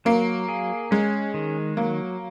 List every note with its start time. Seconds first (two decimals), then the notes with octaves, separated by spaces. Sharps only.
0.05 F#3 A#3
0.48 G#4
0.91 G#3 C#4
1.34 D#3
1.77 F#3 A#3